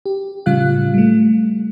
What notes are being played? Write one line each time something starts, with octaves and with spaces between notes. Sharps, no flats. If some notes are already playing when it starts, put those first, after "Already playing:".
G4
A2 C#3 G3 F4 F5 F#6
G3 A3